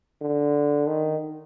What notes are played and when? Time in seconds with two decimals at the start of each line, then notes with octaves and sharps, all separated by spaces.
0.21 D3
0.87 D#3